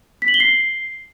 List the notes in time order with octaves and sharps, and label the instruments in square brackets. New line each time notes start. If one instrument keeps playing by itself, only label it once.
[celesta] B6
F#7
G7
C7